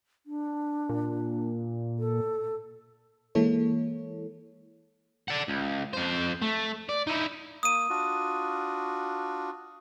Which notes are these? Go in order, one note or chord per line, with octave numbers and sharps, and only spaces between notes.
D4
A#2
A4
E3 G#3 A#3 E4 A4 C#5
D5 F#5
C#2
F2 C5
A3
D5
D#4 E4
A#3 D#6 D#7
D4 F4 F#4